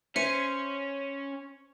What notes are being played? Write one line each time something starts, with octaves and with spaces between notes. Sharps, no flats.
C#4 C5 E5 C#7 D#7